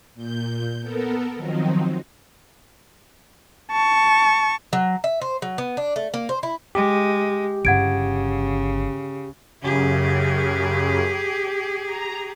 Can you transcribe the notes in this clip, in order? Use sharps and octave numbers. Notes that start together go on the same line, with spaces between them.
A#2 G6
B3 A4 A#4
D#3 F3 F#3 C4 D#4
A5 C#6
F#3
E5
C5
F#3
B3
D4
A3
A#3
C5
E4
G#3 G4
G1 C#3 F#5 G#6 D7
F#2 C#3 G4 G#4
A#5